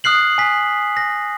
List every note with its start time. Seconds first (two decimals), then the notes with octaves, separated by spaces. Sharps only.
0.04 D#6 F6 F#6 C7 F#7
0.38 G#5 B6
0.97 A#6